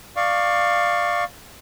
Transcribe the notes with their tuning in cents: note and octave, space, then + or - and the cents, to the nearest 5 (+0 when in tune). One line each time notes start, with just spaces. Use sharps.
D5 +20 F5 +0 C#6 +0